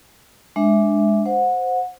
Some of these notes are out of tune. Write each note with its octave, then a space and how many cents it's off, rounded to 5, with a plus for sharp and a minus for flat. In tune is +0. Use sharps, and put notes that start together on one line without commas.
G#3 +0 D4 +0 E5 +0
C5 -5 F#5 -25